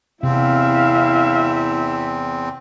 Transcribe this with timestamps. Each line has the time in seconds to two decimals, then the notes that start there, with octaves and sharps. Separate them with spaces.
0.23 E2 C3 C4 E4 E5 F5